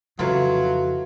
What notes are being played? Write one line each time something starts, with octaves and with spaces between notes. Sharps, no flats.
F2 C#3 E3 F#3 F4 F#4 A4 F5